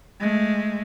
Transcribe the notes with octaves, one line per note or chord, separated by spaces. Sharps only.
G#3 A3